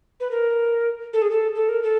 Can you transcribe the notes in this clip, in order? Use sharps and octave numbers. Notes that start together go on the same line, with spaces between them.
B4
A#4
A4
G#4
A4
A4
A#4
A4